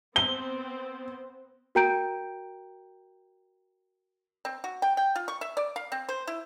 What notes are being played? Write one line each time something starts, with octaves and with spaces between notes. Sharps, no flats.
B3 C4 G7
F#4 A#4 G5 A#5 G6 D7
C4
F#4
G5
G5
F4
C#6
E5
D5
F5
C4
C5
E4